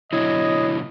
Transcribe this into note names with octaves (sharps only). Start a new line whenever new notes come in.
B2 D3 F#3 E4 C#5 D#5